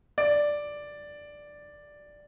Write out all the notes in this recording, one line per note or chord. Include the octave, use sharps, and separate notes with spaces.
D5